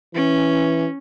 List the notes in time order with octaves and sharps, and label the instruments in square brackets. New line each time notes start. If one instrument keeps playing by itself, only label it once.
[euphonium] E3 [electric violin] C#4